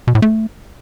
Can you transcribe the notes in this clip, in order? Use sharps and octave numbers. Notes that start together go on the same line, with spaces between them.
B2
A2
A3